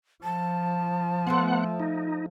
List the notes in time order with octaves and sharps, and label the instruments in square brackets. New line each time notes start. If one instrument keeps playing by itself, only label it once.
[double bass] F3 [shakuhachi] A5
[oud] A3 F4 C5 [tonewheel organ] B3 F#5
[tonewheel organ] D#4